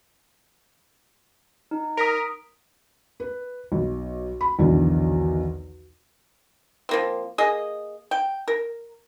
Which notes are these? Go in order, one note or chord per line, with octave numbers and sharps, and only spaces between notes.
D#4
A#4 D#6 B6 D7
B4
B1
B5
B1 E2 D3 D#3 D5
F3 A#3 C4
A#3 G#4 D#5
G5
A#4